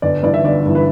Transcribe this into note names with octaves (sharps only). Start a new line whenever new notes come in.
G1 D5
G2 E3 D5
E5
G1 D5
G2 E3
B4